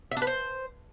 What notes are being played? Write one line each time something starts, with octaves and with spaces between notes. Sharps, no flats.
E5
D4
B4
C5